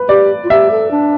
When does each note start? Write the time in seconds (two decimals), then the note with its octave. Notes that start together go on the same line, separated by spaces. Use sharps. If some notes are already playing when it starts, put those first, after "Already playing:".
Already playing: B4
0.09 G4 D5
0.44 F4
0.50 G4 E5
0.71 A4
0.91 D4